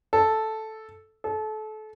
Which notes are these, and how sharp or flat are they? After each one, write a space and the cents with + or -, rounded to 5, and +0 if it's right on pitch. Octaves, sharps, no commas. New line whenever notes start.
A4 -5
A4 -30